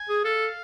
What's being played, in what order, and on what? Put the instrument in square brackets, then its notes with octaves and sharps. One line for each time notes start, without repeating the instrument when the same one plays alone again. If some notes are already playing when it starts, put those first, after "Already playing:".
Already playing: [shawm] G#5
[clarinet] G#4
[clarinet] A4 [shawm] F5